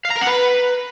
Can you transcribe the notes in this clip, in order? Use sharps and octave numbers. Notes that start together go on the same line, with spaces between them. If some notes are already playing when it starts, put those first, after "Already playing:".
F5
A#5
A#4
F#5
B4